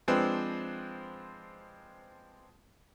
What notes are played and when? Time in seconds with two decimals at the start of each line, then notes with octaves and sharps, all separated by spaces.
0.08 F3 G#3 C4 D4 B4